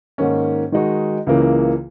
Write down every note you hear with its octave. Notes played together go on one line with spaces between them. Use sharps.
G#2 D#3 A#3 C#4
D#3 G#3 D#4 F#4
C#2 C#3 E3 A#3